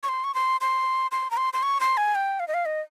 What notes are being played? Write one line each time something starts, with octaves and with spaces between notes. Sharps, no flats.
C#6
C6
C#6
C6
C6
C6
A#5
C6
C6
C#6
C6
G#5
G5
F5
D#5
F5
D#5